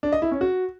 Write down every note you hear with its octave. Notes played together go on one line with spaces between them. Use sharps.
D4
D#5
E4
C#4
F#4